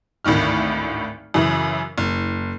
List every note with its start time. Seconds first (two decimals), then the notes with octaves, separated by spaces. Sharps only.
0.25 G#1 D2 A2 D#3 F6
1.34 F#2 C#3 E3
1.98 F#1